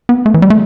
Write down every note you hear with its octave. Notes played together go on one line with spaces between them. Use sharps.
B3
A3
E3
G3
A3